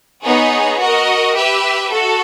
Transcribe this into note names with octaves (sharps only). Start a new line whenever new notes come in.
B3 D#4 G#4 C#5
F#4 A#4 D#5
G4 B4 E5
F#4 A4